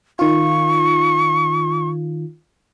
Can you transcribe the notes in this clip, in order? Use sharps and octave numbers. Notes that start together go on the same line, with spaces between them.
D#3 F4 C#6